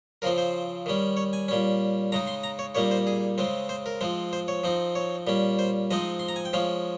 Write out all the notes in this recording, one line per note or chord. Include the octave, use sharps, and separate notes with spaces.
C#3 F3 C4 A#4
C5
D#3 G3 C#4
C#5
G#5
A#2 G3 C#4
C#3 G#3 D#4 A#5
C6
A#5
C#5
A#2 G3 A#3 D#4 C#5
C5
G#4
C#3 G#3 C4
C5
A#4
F3 G#3 C4
C5
C#5
F3 C4 D#4
C#5
A#2 G3 C#4
C5
F3 G#3 C4 D#4 D#5
C6
A#5
G#5
G5
F3 G#3 C#4 F5